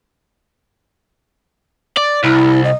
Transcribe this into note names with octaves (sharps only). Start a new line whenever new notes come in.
D5
C2 E4
D#5